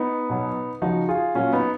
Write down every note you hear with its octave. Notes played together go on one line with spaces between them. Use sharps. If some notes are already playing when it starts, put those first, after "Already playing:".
Already playing: B3 D#4
B2 F#3
C#3 F3 D#4 F#4
F4 G#4
A#2 F#3 C#4 F4
B3 D#4